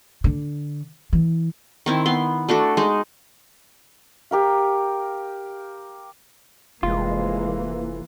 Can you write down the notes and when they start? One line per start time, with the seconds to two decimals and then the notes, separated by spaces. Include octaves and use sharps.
0.24 D3
1.13 E3
1.86 D#3 C4 E4
2.06 B3 C6
2.49 A3 D4 F#4 A4
2.77 G#3 D#4
4.31 G4 A#4 F5
6.83 F1 E3 G#3 A#3 F4